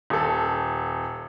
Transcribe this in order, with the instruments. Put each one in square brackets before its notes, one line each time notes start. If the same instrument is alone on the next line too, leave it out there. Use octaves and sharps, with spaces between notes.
[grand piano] D#1 A4